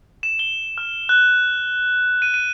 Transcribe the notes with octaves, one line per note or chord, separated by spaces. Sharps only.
E7
G7
F6
F#6
D#7
D#7